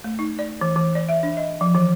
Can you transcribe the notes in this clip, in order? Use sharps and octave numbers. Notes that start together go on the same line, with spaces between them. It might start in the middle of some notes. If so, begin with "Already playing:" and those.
A3
D#4
D5
E3
E3
D5
E5
D4
D#5
F3
E3